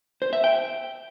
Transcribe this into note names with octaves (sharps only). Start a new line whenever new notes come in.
C5
E5
G5